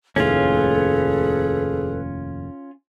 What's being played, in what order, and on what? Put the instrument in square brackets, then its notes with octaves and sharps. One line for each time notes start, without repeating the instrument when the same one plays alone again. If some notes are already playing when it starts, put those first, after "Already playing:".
[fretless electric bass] F1 D#2 A2 [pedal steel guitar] C#4 F4 [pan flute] G#4 [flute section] A4 B4